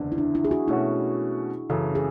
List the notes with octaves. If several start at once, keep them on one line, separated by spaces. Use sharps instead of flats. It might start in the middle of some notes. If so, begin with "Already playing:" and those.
Already playing: F#1 E2 D3
E4
D4
E4
G#4
F#4
B2 A3 C#4 E4 F#4
F#2 C#3 E3 A4
G#4